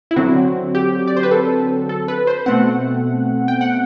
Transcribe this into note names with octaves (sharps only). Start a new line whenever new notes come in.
E4
D3 F#3 C4 F#4
G4
D5
C5
B4
A4
A4
B4
C5
B2 A3 C4 F#5
G5
F#5